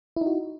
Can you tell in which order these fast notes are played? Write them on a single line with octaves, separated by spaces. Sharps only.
E4 D#4 F#4